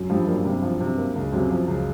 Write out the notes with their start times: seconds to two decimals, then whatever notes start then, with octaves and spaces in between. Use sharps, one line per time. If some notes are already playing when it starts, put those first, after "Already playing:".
Already playing: F#2 F#3
0.09 G2 F3 G3
0.27 F#2 F#3 A#3
0.44 G2 C3 G3
0.62 F3
0.80 C3
0.98 A#3
1.16 C#2
1.32 F#2 C3 F#3
1.50 F3
1.68 C#2